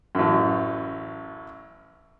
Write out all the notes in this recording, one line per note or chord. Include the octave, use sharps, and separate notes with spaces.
A1 F#2